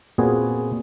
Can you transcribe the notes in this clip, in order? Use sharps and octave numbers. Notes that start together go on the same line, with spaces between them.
A#2 B3 C4 F#4 G#4